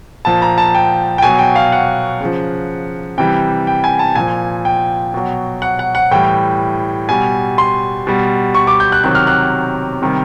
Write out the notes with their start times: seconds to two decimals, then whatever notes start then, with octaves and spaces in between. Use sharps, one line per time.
0.25 A#2 F3 A5
0.42 A#5
0.58 A5
0.75 G5
1.18 G5
1.22 B2 F#3 G#5
1.39 G5
1.55 F5
1.72 F#5
2.21 C#3 F3
3.18 C3 E3 G3 G5
3.67 G5
3.84 G#5
3.99 A5
4.15 A#2 F3 G#5
4.65 G5
5.14 B2 F#3
5.62 F#5
5.79 F#5
5.95 F#5
6.11 A2 E3 G3 G5
7.09 B2 G3 G#5
7.58 C6
8.07 B2 G3
8.55 C#6
8.67 D6
8.80 G6
8.92 F#6
9.04 C3 D#3 F#3 F#6
9.15 F6
9.27 F#6
10.02 C3 D#3 G3